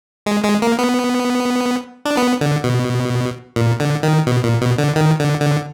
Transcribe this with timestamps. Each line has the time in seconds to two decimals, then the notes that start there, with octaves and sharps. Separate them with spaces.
0.26 G#3
0.44 G#3
0.62 A#3
0.79 B3
2.05 D4
2.17 B3
2.41 D3
2.64 B2
3.56 A#2
3.80 D3
4.03 D#3
4.27 B2
4.44 A#2
4.61 B2
4.78 D3
4.96 D#3
5.19 D3
5.41 D3